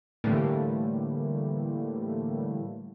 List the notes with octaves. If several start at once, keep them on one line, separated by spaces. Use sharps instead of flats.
A2 D3 E3 G3 A3 A#3